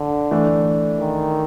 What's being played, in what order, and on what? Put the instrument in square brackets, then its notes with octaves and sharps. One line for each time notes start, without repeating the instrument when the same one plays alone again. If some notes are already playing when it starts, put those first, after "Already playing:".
Already playing: [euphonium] D3
[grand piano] E3 A3 D4
[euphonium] D#3